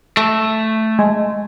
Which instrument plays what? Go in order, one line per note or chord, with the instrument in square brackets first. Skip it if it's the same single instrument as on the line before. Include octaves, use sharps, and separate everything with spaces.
[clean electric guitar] A3
[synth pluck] G#3